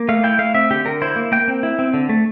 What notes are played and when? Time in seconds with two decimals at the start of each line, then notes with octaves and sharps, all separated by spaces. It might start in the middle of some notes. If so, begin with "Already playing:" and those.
Already playing: A#3
0.09 A3 F5
0.24 E4 G5
0.39 A3 F5
0.54 C4 E5
0.71 D3 G4
0.85 D3 A#4
1.02 E4 C5
1.16 A#3
1.32 A#3 G5
1.48 C4
1.63 E4
1.79 C4
1.94 D3
2.09 A3